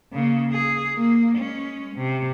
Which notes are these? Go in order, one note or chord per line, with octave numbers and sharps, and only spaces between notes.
C#3 A#3
G#4
A#3
G#3 C#4
C3